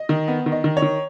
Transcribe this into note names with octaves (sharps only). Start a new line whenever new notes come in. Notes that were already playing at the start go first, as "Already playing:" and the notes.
Already playing: D#5
D#3
B3
D#3
D#5
D#3
C#5
D#3